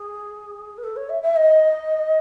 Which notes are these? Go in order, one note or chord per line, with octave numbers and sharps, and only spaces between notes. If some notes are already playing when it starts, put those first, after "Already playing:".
Already playing: G#4
B4
A4
C#5
E5
E5
D#5